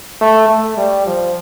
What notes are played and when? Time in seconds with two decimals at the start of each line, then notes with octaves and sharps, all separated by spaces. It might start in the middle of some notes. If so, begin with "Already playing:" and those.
0.21 A3
0.49 A3
0.77 G3
1.06 F3